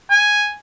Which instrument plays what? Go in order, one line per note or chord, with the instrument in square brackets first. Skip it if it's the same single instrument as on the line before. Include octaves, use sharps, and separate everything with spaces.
[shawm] G#5